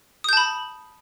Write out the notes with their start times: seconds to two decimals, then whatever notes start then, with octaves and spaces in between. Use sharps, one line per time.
0.24 D#6
0.29 G6
0.33 A5
0.37 B5